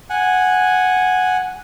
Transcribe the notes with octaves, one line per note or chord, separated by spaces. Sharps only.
F#5 G#5